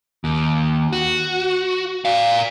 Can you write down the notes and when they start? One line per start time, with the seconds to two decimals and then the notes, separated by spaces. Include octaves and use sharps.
0.24 D#2
0.93 F#4
2.05 D5 F5